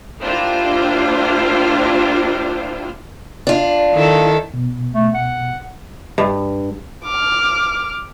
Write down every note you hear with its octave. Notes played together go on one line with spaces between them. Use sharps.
A#3 D4 E4 F4 G4 C5
D4 F4
D#3 E4 A4
B2
A3
F#5
G2
D6 F6